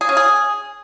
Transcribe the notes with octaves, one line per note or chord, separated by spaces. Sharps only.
G#4
C#4
G#4